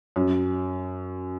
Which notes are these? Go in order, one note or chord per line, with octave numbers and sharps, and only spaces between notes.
F#2